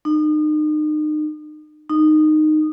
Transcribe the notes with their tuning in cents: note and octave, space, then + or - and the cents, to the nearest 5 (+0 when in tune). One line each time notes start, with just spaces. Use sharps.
D#4 -35
D#4 -15